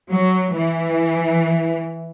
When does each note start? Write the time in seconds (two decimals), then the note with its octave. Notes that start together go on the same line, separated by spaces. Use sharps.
0.11 F#3
0.56 E3